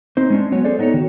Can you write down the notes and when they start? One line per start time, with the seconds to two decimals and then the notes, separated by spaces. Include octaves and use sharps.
0.17 C4 D#4 C5
0.30 G#3 C#4 D4
0.52 F#3 B3 C#4 C#5
0.65 G#4 A4 C5 D5
0.79 B3 D4 D#4 F4 A4 C#5
0.94 D#3 F#4